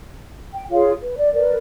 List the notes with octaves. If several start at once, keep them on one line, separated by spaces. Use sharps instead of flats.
G5
F4 G#4 C#5 F5
B4
D5
A#4 B4 D5